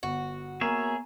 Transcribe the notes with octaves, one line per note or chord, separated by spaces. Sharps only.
G1 F#4
A#3 B3 G#4 C#5 E5 G#5 A#5